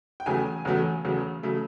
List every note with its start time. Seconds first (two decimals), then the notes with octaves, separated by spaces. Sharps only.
0.20 G5
0.26 E2 C#3 F#3 A3 G#5
0.65 E2 C#3 F#3 A3
1.05 E2 C#3 F#3 A3
1.43 C#3 F#3 A3